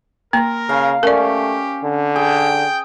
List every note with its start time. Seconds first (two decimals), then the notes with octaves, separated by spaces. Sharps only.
0.33 A#3 A#4 A#5 C6
0.69 C#3 F5
1.03 A3 C#4 G4 A#4 D5
1.83 D3
2.16 G#4 G5